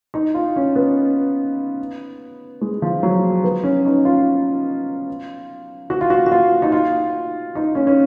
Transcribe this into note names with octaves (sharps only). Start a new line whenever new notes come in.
D#4
F4
C#4
B3
G#3
F3
F#3
B3
C#4
D#4
F4
F#4
F4
F#4
F#4
F4
D#4
F4
D#4
C#4
C#4